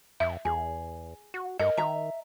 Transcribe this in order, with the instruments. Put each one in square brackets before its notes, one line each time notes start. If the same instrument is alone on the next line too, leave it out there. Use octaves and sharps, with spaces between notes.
[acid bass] F2 [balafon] E5
[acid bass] E2 [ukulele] G#4
[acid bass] F#4
[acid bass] G2 [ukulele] A#4 [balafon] D#5
[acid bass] D#3 [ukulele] E5 A#5